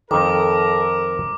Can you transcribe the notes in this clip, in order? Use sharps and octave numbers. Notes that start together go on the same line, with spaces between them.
F2 D#3 A4 A#4 D6